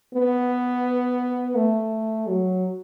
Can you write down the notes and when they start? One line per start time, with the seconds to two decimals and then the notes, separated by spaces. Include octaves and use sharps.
0.14 B3
1.55 A3
2.27 F#3